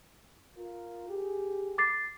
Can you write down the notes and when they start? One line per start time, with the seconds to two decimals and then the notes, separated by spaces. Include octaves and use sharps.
0.57 F4 A#4
1.09 G4 G#4
1.78 D6 A6 C7